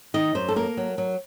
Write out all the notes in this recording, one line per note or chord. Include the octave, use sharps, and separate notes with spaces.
D#3 D#5
F#2 C5
A4
A#3 A#4
F#3
F#3